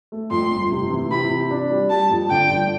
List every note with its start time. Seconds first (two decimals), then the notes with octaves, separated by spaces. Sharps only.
0.12 A3
0.31 F2 C6
0.51 G1
0.71 C3
0.91 E3
1.10 C3 B5
1.30 C3
1.51 D4
1.71 G3
1.90 G3 A5
2.11 F2
2.30 D3 G5
2.50 G1